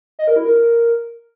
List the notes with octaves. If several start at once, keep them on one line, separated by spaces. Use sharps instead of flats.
D#5
A#4
E4
A#4